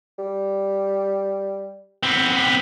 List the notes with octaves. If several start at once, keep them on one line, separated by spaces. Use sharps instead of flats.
G3
B3 C4